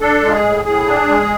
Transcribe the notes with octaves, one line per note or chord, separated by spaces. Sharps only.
D4 A4
G#3
F4
G#4
A2
A2 G#4
D4
G#3